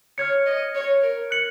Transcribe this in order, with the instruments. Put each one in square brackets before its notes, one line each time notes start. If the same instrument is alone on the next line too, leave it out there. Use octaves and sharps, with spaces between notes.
[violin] C#5 [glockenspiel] F6 G#6 C#7
[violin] D#5
C#5
A#4
[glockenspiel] F#6 C#7 F#7